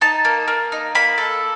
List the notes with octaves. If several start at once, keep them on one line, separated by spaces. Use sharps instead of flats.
D#4 A5
A#3
A#3
D#4
A#3 B5
A4